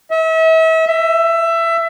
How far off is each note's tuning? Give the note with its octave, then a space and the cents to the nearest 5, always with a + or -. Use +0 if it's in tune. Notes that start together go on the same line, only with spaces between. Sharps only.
E5 -35
E5 +20